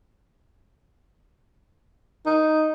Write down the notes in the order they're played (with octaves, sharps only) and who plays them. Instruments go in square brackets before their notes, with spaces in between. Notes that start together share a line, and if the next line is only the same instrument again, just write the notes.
[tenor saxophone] D#4